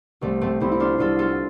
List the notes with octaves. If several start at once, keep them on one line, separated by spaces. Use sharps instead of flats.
C2 A3 C4
A3 C4
C2 C4 E4
E4
D4 F4
C2 F4 A4
F4 A4